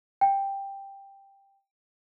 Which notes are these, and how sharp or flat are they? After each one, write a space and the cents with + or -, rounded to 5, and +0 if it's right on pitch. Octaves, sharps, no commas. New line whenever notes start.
G5 +5